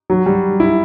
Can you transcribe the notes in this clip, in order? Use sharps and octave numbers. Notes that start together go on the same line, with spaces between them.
F#3
G3
E4